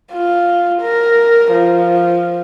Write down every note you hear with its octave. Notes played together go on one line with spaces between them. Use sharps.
F4
A#4
F3